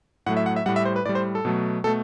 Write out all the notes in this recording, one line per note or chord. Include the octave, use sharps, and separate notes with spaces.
A2 F#3 A3 F#5
E5
F#5
E5
A2 G3 F#5
E5
C5
B4
A2 G3 D5
C5
A4
B2 F#3 A3
B2 A3 A4